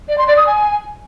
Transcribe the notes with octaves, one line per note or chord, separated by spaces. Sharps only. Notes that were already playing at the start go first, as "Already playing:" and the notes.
D5
C6
D5
D#6
G#5